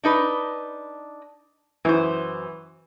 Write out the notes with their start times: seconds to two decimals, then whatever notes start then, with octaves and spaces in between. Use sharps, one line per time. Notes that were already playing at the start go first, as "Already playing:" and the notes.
0.04 D4 D#4 B4
1.85 F#2 E3 C5